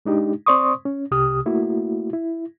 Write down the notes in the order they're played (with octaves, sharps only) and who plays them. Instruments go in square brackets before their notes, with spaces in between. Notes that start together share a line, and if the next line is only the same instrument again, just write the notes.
[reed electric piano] G#3 D4 D#4 G4
C4 C5 D5 C6 C#6 D#6
C#4
C2 C3 G4 D#6 F6
A3 A#3 E4 F#4
E4